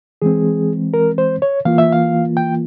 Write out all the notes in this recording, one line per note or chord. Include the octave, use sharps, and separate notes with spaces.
E3 G#3 C4 G#4
A#4
C5
C#5
E3 A#3 F4 F5
E5
F5
G5